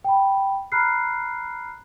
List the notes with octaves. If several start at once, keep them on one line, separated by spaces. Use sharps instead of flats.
G5 B5
A#5 B5 F6 F#6 C7